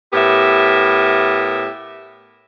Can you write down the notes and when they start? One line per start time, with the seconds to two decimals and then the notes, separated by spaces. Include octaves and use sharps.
0.13 A2 B3 G4 A#4 E5